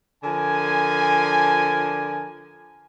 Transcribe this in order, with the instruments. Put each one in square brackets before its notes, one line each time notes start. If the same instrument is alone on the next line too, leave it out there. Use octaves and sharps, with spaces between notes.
[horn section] D3 F3 A#4 G#5